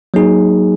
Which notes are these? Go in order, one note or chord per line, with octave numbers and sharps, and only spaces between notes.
F#3 A#3 D#4 G#4